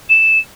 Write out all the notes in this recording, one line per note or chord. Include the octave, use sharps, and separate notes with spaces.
E7